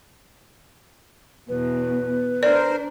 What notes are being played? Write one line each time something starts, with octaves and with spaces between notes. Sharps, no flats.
E2 B2 B4
D4 A#4 C5 D5